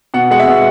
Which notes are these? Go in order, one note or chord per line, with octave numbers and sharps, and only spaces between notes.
B2 F#5
G#3 F#5
E5
B2